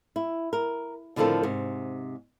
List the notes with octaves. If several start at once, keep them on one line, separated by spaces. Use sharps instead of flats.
E4
A#4
A2 D3 D#3 F3 C4 A4
G#2 C3